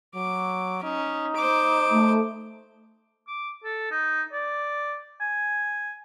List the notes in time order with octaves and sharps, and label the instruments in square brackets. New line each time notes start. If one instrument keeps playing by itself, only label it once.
[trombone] F#3 [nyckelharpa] D6
[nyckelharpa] C#4 [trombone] D#4
[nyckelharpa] C5 D6
[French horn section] A3
[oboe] D6
A4
D#4
D5
G#5